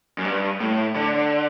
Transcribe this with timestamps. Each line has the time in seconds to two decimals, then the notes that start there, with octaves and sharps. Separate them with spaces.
0.18 F#2
0.25 G2
0.60 A2
0.95 D3